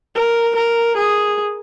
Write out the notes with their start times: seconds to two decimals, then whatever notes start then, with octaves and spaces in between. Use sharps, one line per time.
0.15 A#4
0.56 A#4
0.97 G#4